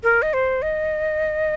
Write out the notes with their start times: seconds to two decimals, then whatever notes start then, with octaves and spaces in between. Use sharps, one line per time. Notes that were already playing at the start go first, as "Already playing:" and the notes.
0.03 A#4
0.22 D#5
0.33 C5
0.62 D#5